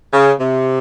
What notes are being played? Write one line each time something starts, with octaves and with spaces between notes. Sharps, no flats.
C#3
C3